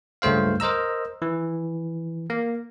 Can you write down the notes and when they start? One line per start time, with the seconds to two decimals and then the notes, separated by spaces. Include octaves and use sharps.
0.22 C#2 G2 A3 C5 F5
0.60 A#4 C5 D#5 A#5 E6
1.22 E3
2.30 A#3